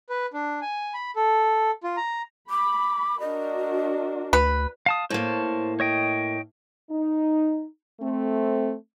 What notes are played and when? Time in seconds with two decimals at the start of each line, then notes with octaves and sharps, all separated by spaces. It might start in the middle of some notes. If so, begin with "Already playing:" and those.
0.09 B4
0.33 D4
0.62 G#5
0.94 B5
1.16 A4
1.84 F4
1.97 A#5
2.50 B5 D6
3.20 D4 F#4 A#4 D#5
4.33 D2 B4
4.86 F5 A5 D#6
5.10 A2 A#3 C5 C#5 A5
5.80 C#5 D#5 G5
6.89 D#4
8.01 A3 C4